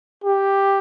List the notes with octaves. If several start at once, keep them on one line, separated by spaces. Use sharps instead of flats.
G4